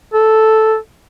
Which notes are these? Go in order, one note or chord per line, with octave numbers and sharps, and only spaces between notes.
A4